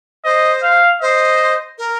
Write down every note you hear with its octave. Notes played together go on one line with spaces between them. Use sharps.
C5 D#5
F5
C5 D#5
A#4